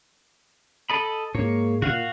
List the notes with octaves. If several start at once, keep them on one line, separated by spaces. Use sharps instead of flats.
A4 D#5 B5
G#2 A#3 C#5
A#2 F#4 F5 F#5